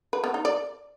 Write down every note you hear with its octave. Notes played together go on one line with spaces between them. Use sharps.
B4
B3
D#4
D5